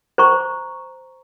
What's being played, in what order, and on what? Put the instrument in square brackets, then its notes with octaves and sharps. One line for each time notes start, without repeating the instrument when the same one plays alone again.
[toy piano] C5 A#5 C#6